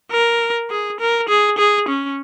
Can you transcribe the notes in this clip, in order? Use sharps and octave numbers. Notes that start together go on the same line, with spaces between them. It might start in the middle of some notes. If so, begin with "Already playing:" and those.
A#4
G#4
A#4
G#4
G#4
C#4